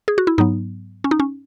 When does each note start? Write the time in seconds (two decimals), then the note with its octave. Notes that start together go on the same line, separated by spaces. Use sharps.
0.08 G#4
0.18 F#4
0.27 E4
0.38 G#2 F#3 B3 D#4
1.04 C#4
1.11 D#4
1.20 C#4